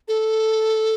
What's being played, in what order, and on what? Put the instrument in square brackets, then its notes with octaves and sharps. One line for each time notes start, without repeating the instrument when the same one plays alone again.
[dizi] A4